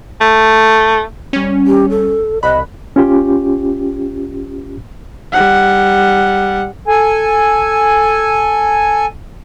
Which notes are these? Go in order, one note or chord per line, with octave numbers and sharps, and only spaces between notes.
A3
G3 C#4
G4
A4
C2 D#5 B5 F#6
C#4 F4 G4
G3 F#5
A4 G#5